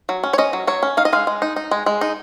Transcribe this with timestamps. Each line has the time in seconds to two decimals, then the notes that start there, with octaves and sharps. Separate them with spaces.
0.09 F#3
0.23 C#4
0.33 C#5
0.38 C#4 D#5
0.53 F#3
0.67 F#3 C#5
0.83 C#4
0.97 D#4 F5
1.05 D#5
1.13 G#3 F5
1.27 G#3
1.42 D#4
1.56 D#4
1.71 G#3
1.86 G#3
2.01 D#4